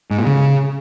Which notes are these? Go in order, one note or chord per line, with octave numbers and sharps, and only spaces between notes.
G#2
A#2
C#3